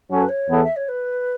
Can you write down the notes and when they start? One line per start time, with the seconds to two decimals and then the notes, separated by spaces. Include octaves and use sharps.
0.10 F#2 F#3 C#4 A4 C#5
0.22 B4
0.28 C#5
0.48 E2 E3 B3 A4
0.63 E5
0.76 C#5
0.88 B4